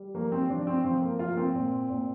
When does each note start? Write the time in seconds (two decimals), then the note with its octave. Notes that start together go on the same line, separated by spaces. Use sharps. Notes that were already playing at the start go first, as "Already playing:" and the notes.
Already playing: G3
0.14 F3 A#3
0.32 C4
0.50 F3 D4
0.67 C4
0.84 F3 C4
1.02 A#3
1.19 F3 F4
1.31 A#3
1.37 C4
1.54 A#2
1.89 A#2